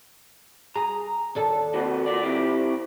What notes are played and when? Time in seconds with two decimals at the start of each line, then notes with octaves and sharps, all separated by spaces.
0.76 G#4 A#5
1.35 D#2 D4 A4
1.74 C3 A#3 F#4
2.06 F4 A#4 D5
2.23 C4 E4 G4